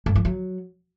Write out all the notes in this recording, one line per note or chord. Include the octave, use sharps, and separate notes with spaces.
G2
F3
F#3